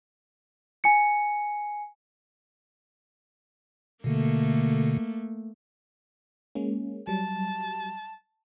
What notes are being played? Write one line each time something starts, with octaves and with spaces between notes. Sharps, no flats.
G#5 C#7
B2 D3 A3 A#3
G#3 A#3 C#4
F#3 G3 A5